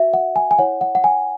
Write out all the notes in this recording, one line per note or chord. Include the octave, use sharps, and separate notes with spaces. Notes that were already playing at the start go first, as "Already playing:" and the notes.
Already playing: F#4 B4 E5
F#5
G#5
G#5
E4 C#5 F#5
F#5
F#5
G#5